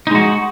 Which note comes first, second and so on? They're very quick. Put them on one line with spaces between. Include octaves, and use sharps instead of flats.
D#4 G#3 F#4